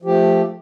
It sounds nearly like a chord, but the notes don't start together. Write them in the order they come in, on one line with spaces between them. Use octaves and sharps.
F3 G4 A3